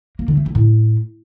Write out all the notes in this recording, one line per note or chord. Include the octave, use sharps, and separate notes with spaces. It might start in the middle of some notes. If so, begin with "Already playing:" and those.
A#3
D3
A3
D3
A2